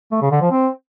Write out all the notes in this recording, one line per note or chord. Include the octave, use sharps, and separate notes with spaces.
A3
C#3
D3
F3
C4